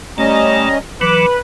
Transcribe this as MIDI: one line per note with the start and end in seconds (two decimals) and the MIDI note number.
0.18 0.75 55
0.18 0.69 57
0.18 0.78 61
0.18 0.78 75
0.18 0.75 82
1.01 1.26 52
1.01 1.26 54
1.01 1.37 71
1.01 1.26 86